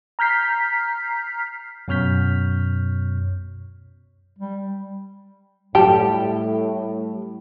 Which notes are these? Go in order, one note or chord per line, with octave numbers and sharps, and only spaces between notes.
A#5 F6 G6 B6 C7
F#2 B2 C#5 F6 G6 B6
G3
A2 G3 G4 A5